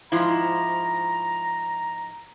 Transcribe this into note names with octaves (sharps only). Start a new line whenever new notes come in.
G#2 F3 E4 A#5